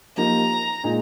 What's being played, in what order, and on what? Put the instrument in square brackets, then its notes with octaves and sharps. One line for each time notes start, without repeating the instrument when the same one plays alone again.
[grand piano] F3 A#3 D#4 G4 [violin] A#5
[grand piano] A#2 G#3 D#4